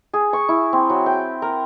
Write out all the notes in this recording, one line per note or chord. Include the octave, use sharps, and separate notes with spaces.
G#4
C#6
E4
C4
F#3
G5
A#4